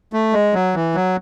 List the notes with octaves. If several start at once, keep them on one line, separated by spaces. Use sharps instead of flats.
A3
G#3
F#3
E3
F#3